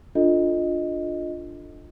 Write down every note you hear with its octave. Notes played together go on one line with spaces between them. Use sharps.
D4 F4 A4 D#5